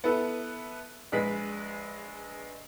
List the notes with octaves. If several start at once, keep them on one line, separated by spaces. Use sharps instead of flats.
B3 E4 A4 B4
A#1 G#3 B4 B6